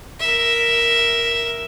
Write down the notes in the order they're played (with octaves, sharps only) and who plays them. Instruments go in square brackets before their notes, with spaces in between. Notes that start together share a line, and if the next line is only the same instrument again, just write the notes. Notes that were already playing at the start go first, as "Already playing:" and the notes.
[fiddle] A#4 E5